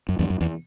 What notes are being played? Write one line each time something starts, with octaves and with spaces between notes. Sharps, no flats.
F#2
E2 G2
F#2
E2